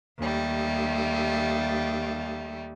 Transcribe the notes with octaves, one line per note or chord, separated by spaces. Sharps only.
D#2 G3 A3